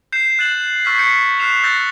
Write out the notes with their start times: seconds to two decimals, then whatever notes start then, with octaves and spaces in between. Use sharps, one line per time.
0.12 G6 C7 E7
0.39 F#6 A6 E7 F#7
0.85 C#6 E6 F6 G#6 A6 B6
0.98 G6 B6 C#7
1.39 F6 F#6 B6 C7 E7 F7
1.63 E6 F#6 G6 A6 A#6